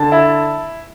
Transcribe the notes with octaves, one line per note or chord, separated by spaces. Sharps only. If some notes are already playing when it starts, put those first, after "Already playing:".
Already playing: D3 A5
E4